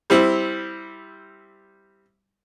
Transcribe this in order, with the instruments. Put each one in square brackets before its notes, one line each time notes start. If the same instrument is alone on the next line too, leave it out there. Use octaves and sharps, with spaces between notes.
[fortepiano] G3 C4 E4